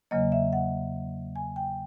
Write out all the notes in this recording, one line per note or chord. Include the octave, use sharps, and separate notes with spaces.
E2 C#3 F#3 A#3 D#5
E5
F#5
G#5
G5